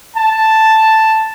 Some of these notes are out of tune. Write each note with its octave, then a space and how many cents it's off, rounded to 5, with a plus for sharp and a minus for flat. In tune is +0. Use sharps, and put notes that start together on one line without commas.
A5 +0